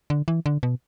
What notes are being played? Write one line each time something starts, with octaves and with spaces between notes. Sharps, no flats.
D3
E3
D3
B2